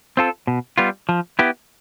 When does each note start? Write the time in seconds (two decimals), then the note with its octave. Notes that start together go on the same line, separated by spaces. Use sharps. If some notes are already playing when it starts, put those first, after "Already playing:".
0.17 C4 F4 A4
0.47 B2
0.78 G3 B3 F4
1.09 F3
1.39 B3 E4 G4